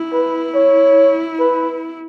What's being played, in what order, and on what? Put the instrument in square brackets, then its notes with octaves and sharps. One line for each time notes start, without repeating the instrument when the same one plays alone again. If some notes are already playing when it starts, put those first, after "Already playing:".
Already playing: [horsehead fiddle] E4
[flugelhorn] B4
C#5
B4